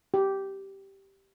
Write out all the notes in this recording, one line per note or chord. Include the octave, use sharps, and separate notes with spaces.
G4